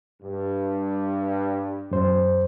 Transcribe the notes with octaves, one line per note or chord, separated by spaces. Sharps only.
G2
F#2 C5